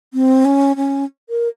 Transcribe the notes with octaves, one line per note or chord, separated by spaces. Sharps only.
C4
C#4
C#4
A#4